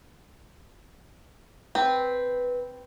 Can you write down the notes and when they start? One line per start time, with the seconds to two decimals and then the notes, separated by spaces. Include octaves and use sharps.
1.75 C4 B4